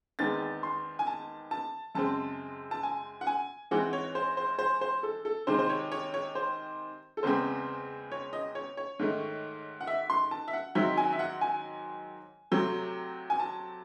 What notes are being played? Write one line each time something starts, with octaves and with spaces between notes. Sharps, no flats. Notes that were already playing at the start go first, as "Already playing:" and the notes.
E2 D#3 G#3 C4 A6
C6
G#5
A5
A5
F#2 C#3 G#3 C4 A5
A5
G#5
F#5
G#5
G#2 E3 G#3 C4 F#5
C#5
C5
C5
C5
C5
A4
A4
C3 D#3 G#3 C4 C5
C5
C#5
C#5
C#5
C5
A4
E2 C#3 G#3 C4 C5
C#5
D#5
C#5
C#5
G#2 D#3 A3
F#5
E5
C6
A5
E5
F#5
G#2 D#3 F#3 C4 E5
G#5
E5
F#5
G#5
C3 F#3 A3 C4
G#5
A5